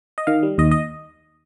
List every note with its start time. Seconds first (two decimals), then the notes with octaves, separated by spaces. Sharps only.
0.18 D#5
0.27 D#3 F5
0.43 G3
0.58 D#2 D#5
0.71 D#5